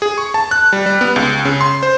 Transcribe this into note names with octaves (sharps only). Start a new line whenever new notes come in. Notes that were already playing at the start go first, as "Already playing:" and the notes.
G#4
C#6
A5
F#6
G3
G3
B3
C#2
C#3
C6
C5